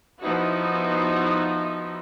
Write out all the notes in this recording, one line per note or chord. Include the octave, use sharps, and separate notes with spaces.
F3 B3 D#4 E4 F#4